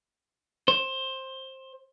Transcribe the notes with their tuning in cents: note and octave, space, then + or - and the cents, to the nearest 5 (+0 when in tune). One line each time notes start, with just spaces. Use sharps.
C5 +15